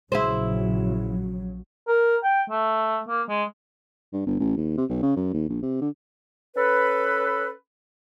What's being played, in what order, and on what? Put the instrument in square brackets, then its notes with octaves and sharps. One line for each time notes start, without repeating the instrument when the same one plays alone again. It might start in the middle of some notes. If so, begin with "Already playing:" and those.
[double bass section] A#1 C#3 F#3 [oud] E4 G#4 C5
[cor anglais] A#4
G5
A3
A#3
G#3
[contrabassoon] G2
G1
A1
D#2
C3
B1
C#3
F#2
D#2
A#1
C3
D3
[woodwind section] C#4 A4 B4